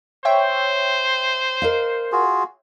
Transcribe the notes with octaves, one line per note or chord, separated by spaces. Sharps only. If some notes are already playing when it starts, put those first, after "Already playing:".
C5 C#5 E5 G5
A#4 D#5 F5
F4 F#4 G#4